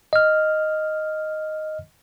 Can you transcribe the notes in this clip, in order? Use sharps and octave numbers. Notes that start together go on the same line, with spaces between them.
D#5 F6